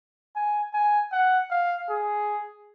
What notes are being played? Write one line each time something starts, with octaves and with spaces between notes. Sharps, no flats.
G#5
G#5
F#5
F5
G#4